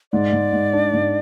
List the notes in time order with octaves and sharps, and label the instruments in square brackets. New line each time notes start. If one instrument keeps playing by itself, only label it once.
[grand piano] G#2 [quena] D5
[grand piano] G#2
G#2
D4
G#2